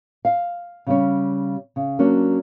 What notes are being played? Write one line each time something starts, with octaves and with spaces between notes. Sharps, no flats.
F5
C#3 G3 C#4
C#3
F#3 A#3 C#4 D4